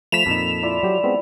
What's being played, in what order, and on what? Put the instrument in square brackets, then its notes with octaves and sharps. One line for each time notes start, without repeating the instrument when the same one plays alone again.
[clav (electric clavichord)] F3 A3 [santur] B5 [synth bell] B6 E7 F7
[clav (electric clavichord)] F2 A#2 D#4 [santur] A4
[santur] E4 F4 D5
[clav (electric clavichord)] F#3 G4
G#3 B3 C4